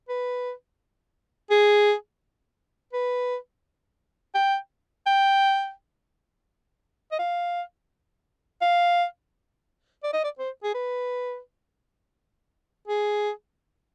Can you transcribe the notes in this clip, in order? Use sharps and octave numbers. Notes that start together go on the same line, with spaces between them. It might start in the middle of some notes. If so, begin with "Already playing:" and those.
B4
G#4
B4
G5
G5
D#5
F5
F5
D5
D#5
D5
C5
G#4
B4
G#4